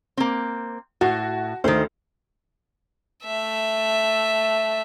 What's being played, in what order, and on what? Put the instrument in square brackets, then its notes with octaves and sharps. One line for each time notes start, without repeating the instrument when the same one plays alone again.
[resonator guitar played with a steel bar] A#3 C4
[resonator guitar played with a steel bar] A2 [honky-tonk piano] F#4
[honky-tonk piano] D2 [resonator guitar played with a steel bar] D#3 C5
[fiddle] A3 E5